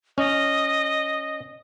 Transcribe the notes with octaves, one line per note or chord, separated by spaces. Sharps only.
C#4 D#5